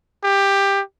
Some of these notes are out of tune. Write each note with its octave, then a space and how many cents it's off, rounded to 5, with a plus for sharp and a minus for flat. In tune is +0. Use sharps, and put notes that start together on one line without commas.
G4 +15